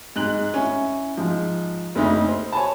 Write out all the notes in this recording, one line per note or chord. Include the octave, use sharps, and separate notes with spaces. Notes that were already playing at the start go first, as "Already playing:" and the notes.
G#2 F#6 F#7
C#4 E4
G#2 F3
F#1 D2 D#4 E5
C5
C#5 G#5 A5